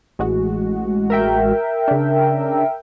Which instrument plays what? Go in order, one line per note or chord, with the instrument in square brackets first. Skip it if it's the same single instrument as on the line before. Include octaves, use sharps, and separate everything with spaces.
[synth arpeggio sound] A1 G#3 F#4
[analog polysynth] A#4 E5 G5
[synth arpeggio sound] C#3 D4